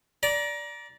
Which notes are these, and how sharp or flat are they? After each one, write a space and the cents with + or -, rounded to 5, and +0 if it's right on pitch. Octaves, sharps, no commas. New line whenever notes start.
D5 -10 A#5 +25